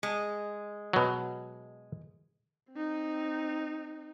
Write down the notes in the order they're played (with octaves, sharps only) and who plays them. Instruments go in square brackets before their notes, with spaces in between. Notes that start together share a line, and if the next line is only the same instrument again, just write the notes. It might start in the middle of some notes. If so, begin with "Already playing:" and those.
[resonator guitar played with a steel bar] G#3
[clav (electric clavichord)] B2 F#3
[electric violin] C4 D#4